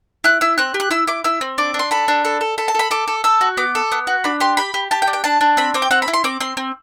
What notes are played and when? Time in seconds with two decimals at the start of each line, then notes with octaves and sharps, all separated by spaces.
0.24 E4 F#6
0.41 E4 E6
0.58 C4 F#6
0.74 G4
0.80 F#6
0.91 E4 E6
1.07 E4 D6
1.24 E4 E6
1.41 C4
1.58 D4 D6
1.74 D4
1.79 C6
1.91 A4 B5
2.08 D4
2.25 A4
2.41 A4
2.58 A4 B5
2.68 A5
2.75 A4 B5
2.91 A4 D6
3.08 A4
3.24 A4 E6
3.41 F#4
3.57 B3 D6
3.75 A4
3.92 B3
4.07 F#4
4.24 D4 B5
4.40 G4 C6
4.57 G4 B5
4.74 G4
4.91 G4 A5
5.02 G5
5.07 D4
5.13 G5
5.24 D4 A5
5.41 D4
5.57 C4 B5
5.74 C4 D6
5.82 G5
5.91 C4 F#5
6.02 B5
6.08 E4
6.13 C6
6.24 C4 D6
6.40 C4 C6
6.57 C4